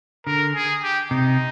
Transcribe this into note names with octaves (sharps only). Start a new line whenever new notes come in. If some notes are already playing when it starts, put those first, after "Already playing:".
D3 A#4
G#4
G4
C3 D#4